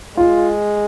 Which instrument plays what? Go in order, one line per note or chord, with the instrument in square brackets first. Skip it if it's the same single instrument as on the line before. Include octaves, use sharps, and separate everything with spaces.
[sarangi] G#3 [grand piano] F4